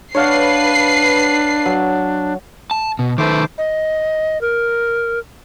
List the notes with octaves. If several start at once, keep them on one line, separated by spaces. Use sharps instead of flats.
D4 B4 C#5 F5 F#5 C7
F#3
A5
B2
D#3 A3 B4 C5 D6
D#5
A#4